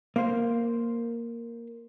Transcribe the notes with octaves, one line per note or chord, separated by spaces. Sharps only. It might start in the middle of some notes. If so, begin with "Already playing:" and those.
A#3 C5